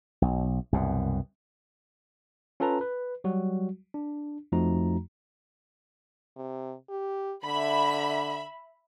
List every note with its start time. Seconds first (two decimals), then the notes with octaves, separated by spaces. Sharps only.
0.22 B1
0.73 C2 F#2 B2
2.60 C#4 F4 A4 B4 A5 A#5
2.81 B4
3.24 F#3 G3 F#4
3.94 D4
4.52 F2 F3 A3 D#4 F#4 A#5
6.36 C3
6.89 G4
7.45 D3 E5 B5